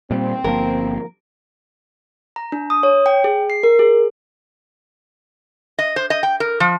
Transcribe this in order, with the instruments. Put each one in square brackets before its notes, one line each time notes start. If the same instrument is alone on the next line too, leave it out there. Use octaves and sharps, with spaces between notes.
[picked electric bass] A#2 G3 [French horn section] C4
[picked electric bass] G1 F3 A#3 [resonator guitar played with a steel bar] A#4
[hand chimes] A#5
D4
D#6
C#5
G5
G#4
C7
A#4
G#4
[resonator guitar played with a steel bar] D#5
C5
D#5
G5
A#4
F3